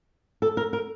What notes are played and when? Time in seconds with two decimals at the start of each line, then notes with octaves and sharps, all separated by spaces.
0.42 A4
0.57 A#4
0.73 A#4